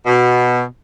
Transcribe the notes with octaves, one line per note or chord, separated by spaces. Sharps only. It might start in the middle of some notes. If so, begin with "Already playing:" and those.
B2